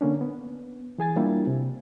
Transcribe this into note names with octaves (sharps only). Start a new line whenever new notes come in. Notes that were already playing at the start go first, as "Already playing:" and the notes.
D3 A#3 C#4 D4
B3
E3 G#4 G#5 A6
G3 A#3 D4 E4 F4 G4
C3